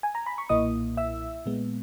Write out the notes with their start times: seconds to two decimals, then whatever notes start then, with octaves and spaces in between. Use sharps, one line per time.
0.03 G#5
0.15 A#5
0.26 B5
0.38 C#6
0.49 B1 A#2 A#3 E4 D#5 D#6
0.97 E5 E6
1.46 A#2 G#3 B3